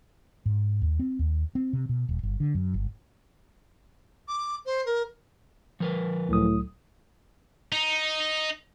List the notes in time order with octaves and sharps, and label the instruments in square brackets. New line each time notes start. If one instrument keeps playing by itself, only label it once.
[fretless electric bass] G#2
D#2
C4
D#2
C4
C3
B2
D#1
G1
D3
F#2
G1
[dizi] D6
C5
A#4
[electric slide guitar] F3 A#4 B4
[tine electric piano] C#2 F#3 D#6 [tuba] A2
[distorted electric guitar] D#4